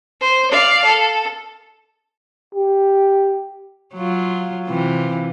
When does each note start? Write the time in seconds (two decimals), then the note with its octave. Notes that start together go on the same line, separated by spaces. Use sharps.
0.21 C5
0.51 D5 F5
0.85 A4
2.55 G4
3.95 F#3 F4
4.69 C3 E3 F4